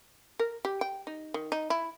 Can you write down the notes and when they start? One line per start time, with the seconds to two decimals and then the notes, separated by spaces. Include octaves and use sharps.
0.39 A#4
0.65 G4
0.81 G5
1.07 D#4
1.34 D#3
1.52 D#4
1.70 E4